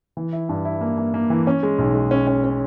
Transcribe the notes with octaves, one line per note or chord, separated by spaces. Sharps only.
E3
E4
G2
E4
A#3
A#3
A#3
E3
C#4
G#3
B1
G#3
C#4
C#4
C#4